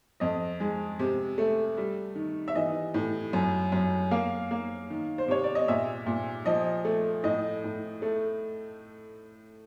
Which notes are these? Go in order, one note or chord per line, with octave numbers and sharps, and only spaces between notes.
F2 D#5
G#3
C3
A3
G3
D#3
E5
E3 D#5
A2
F#2
F#2
A#3 F5
A#3
D#3
C5
C3 C#5
D5
D#5
A#2 E5
A#2
F3 D#5
A3
A2 D#5
A2
A3